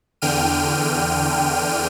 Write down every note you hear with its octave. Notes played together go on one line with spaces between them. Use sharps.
E2 D3 G5 F6 D#7